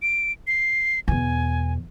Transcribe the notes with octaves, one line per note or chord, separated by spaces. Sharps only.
D7
C7
E2 B2 G#5